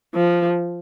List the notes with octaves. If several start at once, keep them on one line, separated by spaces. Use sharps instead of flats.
F3